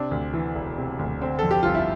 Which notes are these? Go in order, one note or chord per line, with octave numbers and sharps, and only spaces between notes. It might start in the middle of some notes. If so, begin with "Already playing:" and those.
Already playing: C3 D4
D2
E3
E1
C3
D2
D3 C4
F2 A4
G4
G1 F4
E4